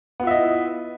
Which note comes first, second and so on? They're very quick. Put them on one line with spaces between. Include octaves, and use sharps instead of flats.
B3 F4 E5 D#5 E4